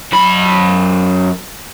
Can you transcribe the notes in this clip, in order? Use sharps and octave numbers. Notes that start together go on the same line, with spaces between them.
F#2 B5